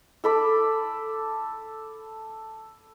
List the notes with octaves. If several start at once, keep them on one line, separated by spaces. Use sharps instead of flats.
A4 B5 D6